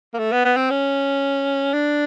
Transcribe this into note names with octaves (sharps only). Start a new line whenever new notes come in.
A#3
A3
B3
B3
C4
C#4
D4